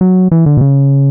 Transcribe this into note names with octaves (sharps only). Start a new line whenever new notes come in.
F#3
E3
D3
B2
C#3